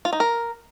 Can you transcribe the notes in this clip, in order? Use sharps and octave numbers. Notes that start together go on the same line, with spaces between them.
F4
D#4
A#4